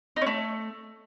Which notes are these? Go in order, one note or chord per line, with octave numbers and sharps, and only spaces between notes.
D#4
C#4
A3